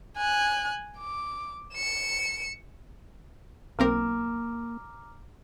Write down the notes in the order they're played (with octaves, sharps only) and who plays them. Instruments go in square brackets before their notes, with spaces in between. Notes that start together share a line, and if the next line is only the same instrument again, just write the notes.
[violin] G#5 F#6
D6
C#7 E7
[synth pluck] B1 C4 A#4 [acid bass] A#3 [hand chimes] A#5 D6 F6